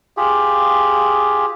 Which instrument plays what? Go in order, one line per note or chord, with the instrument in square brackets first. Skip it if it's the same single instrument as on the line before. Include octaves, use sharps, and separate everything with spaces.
[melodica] F4 G4 G#4